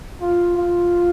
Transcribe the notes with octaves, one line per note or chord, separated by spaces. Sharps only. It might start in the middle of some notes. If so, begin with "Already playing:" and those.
F4
F4